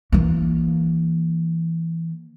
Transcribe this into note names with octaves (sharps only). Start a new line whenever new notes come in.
E3 A#3